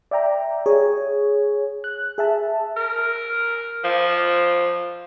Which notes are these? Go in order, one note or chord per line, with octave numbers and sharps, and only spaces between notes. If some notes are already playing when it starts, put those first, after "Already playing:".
D5 E5 G5 A#5
G#4 C#5 G#5
F#6
G#4 E5 A5
A#4
F3